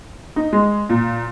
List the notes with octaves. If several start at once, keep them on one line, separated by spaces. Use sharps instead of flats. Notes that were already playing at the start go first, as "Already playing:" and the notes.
D#4
G#3
A#2